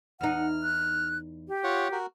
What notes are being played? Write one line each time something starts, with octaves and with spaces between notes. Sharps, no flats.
E2 D#4 F#5 F6
F#6
G4
F4 C#5 F#5
F#4 A#4